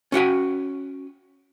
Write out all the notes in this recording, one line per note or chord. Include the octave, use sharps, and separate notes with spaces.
C#4 F#4 G5 G#5